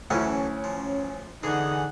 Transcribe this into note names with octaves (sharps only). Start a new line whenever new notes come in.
D2 E3 F#3 C#4 E4 A4
F3
D3 E3 D#4 G#4 F#5